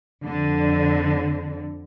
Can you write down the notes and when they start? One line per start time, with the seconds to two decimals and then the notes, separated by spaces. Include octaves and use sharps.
0.24 F2 D3